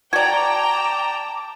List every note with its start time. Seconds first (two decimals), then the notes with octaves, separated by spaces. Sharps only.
0.13 F#4 D5 G5 A5 A#5 D6 G#6